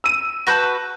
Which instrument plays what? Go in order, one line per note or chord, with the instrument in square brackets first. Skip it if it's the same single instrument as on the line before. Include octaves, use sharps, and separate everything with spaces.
[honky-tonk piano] E6 D#7
[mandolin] F#4 B4 [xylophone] A5 G6 A#6